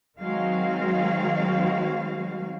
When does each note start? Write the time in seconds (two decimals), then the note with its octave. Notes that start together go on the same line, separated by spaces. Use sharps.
0.19 D#3 F#3 G#3 C4 F#4 F5